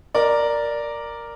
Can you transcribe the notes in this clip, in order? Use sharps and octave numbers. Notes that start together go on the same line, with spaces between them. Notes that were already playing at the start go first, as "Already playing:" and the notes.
A#4 D5